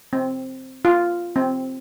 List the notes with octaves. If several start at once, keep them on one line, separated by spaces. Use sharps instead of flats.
C4
F4
C4